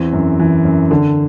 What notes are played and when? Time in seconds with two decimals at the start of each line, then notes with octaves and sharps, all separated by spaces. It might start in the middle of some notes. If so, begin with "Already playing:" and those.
Already playing: E2 E3 C4
0.13 F#2
0.40 E3
0.65 F#2
0.91 D3